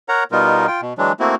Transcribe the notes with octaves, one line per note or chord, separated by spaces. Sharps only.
A#4 C#5 F#5 A#5
B2 G3 B3 D#4 F4 A#4
F4 G5
B2
E3 F#3 G#3 D4
A3 A#3 C4 E4 F#4